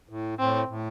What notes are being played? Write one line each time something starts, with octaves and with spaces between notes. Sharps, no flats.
A2
A2 C4
A2